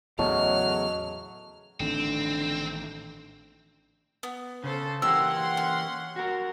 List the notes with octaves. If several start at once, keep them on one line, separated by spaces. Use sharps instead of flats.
E2 A2 C#3 F#3 D#5 A5 C#6 F6
A1 D3 D#3 C4
B3
C#3 A4 C5
E3 A#3 G4 F#5 C6 E6
C#4
F#4 A#4